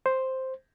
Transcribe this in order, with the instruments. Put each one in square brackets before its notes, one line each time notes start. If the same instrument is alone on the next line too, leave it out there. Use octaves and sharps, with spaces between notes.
[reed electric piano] C5